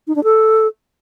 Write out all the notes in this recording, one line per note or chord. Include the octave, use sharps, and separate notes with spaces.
D#4
D4
A4